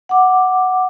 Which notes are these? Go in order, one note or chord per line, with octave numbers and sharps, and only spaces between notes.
F#5 D6